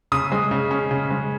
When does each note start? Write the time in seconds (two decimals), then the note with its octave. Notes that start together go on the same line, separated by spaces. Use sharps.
0.12 C#3 D#6
0.32 G#3
0.51 C#3
0.71 C#4
0.91 C#3
1.10 G#3